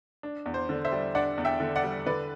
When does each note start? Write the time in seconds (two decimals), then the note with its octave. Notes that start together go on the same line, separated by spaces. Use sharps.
0.23 D4
0.46 E2
0.54 C5
0.69 D3
0.85 C5 E5
0.92 G3
1.15 D4 D5 F#5
1.38 E2
1.45 E5 G5
1.60 D3
1.76 D5 F#5
1.84 G3
2.06 D3 B4 D5